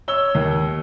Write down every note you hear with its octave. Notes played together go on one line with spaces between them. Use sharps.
C#5 E6 G7
D#2